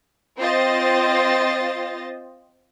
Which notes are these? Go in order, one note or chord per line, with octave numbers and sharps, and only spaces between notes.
C4 F4 C5 D#5 A6